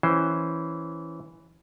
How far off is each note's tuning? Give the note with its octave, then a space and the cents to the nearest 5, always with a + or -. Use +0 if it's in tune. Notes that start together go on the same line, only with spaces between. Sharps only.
E3 +0 C#4 +0 C5 +0